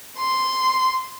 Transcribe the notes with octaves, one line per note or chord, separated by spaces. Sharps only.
C6